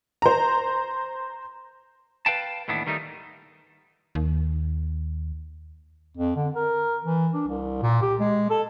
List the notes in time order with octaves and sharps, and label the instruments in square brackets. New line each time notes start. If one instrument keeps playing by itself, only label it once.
[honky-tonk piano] C5 A#5
[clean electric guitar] B4 F5 G5 A5
D#2 A2 E3 B3 D4
D#3 G3 A3 D#4
[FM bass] D#2
[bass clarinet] F2
D3
A#4
E3
D4
C2
A#2
G4
G#3
A4